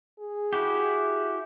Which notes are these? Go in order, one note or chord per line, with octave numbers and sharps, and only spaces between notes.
G#4
E4 F#4 G4